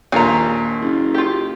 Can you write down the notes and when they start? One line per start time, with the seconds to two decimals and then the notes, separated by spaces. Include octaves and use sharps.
0.12 A#1 D#2 A#2 G#5 A#5
0.81 F#1
1.14 F4 G4